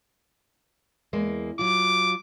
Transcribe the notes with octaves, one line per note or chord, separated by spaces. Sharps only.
E2 G#3 A#3
F#3 F4 D6